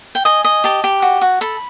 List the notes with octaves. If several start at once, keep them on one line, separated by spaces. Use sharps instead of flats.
G5
D#5 G#5
D#5
G4 A5
G4
F#4
F#4
A4 B5